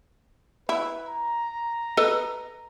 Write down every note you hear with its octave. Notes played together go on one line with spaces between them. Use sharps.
E4 B4
A#5
A4 B4 D#5